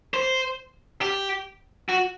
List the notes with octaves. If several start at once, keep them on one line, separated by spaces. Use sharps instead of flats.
C5
G4
F#4